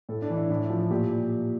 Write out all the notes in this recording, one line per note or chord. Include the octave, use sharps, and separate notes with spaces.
A2 A4
D4
E3
E4
A2 E4
F3
A#2 G4